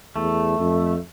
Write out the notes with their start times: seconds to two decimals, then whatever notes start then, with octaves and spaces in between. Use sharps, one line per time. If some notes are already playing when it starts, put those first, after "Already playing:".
0.16 E2 A3
0.59 F2